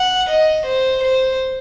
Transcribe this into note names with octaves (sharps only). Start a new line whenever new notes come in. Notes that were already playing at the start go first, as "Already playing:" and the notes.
Already playing: F#5
D#5
C5
C5